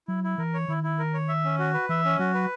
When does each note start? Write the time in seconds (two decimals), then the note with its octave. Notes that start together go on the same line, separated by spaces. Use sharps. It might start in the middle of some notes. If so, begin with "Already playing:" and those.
0.08 F#3 E4
0.24 E4
0.38 E3 A#4
0.54 C#5
0.68 D#3 E4
0.83 E4
0.99 A#4
1.14 C#5
1.29 E5
1.44 C#4
1.59 F#4
1.74 B4
1.89 E3 E5
2.05 C#4
2.19 F#3 F#4
2.34 B4